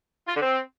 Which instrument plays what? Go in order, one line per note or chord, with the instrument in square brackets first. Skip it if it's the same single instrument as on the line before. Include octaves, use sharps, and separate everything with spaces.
[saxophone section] F4
D3
C4